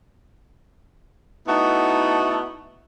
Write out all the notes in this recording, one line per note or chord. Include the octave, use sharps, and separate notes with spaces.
A3 B3 D#4 E4 F#4